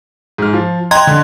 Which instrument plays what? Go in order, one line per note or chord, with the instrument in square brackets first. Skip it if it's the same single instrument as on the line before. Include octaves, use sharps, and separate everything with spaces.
[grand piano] G#2 F6
F3 F4
[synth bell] D#5 C6 G#6 [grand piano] G5 A#5 F#6
[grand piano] D3